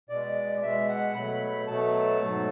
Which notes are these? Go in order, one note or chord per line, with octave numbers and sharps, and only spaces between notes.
B2 G#3 D5
B2 G#3 E5
F#5
B2 F#3 A3 B5
B2 F#3 A3 A5
G#2 F#3 A3